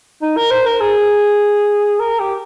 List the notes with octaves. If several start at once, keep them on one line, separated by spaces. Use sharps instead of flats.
D#4
A#4
C5
A#4
G#4
A#4
G4